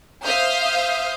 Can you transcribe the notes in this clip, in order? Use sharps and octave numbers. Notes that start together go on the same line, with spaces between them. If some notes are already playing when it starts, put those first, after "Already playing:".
C5 E5 F5 D#6 F6 G6